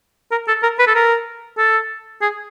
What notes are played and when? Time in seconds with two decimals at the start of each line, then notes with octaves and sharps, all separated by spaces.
0.32 A#4
0.48 A4
0.63 A#4
0.79 B4
0.88 A4
0.95 A#4
1.58 A4
2.22 G#4